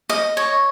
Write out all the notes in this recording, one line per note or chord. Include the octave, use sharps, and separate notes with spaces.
D#5
C#5